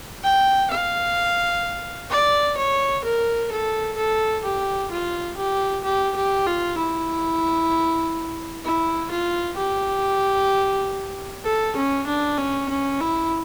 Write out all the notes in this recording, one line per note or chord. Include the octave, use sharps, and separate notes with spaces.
G5
F5
D5
C#5
A#4
A4
A4
G4
F4
G4
G4
G4
F4
E4
E4
F4
G4
A4
C#4
D4
C#4
C#4
E4